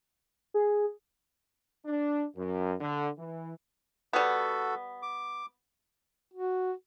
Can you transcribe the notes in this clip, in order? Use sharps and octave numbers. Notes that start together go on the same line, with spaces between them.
G#4
D4
F#2
D3
E3
G3 B3 F#4 A4
D6
F#4